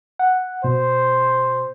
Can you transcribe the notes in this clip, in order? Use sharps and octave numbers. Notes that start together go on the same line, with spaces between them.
F#5
B2 C5